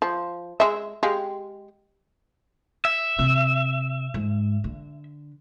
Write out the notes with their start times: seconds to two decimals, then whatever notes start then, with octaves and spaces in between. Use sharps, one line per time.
0.02 F3
0.60 G#3 E5
1.03 G#3 G4 F5
2.85 E5
3.19 C3
4.14 G#2
4.64 D3